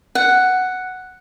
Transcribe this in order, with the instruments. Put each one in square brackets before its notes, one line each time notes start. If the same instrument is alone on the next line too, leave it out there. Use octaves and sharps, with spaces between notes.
[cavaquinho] F#5